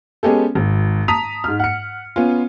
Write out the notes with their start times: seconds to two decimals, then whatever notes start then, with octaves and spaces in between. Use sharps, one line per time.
0.23 G#3 B3 C#4 G4 A4
0.55 G#1
1.08 A5 A#5 D#6 B6 F7
1.44 G#2 F6
1.60 F#5 C#7
2.16 B3 C#4 F4